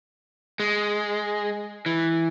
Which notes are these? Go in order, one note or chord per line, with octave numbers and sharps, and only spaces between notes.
G#3
E3